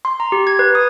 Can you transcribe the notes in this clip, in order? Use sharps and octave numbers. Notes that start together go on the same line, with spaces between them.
C6
A#5
G4
G#6
B4
D#6